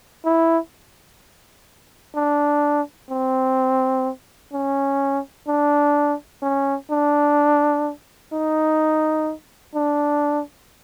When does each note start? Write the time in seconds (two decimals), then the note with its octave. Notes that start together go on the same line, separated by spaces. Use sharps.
0.25 E4
2.15 D4
3.10 C4
4.53 C#4
5.48 D4
6.42 C#4
6.91 D4
8.33 D#4
9.75 D4